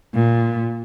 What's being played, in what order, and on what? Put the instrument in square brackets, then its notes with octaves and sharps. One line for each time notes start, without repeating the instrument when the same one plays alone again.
[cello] A#2